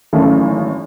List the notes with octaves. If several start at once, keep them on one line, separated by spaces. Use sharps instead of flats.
G#1 F#2 E3 A3